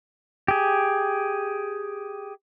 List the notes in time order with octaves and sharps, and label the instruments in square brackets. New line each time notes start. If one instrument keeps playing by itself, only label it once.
[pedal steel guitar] G4 G#4